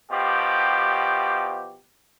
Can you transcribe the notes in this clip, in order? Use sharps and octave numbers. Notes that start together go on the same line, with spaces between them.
B2 F3 G4